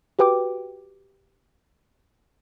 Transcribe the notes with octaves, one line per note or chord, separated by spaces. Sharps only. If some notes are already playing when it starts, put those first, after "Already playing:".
F#4 G4 B4 G5 D6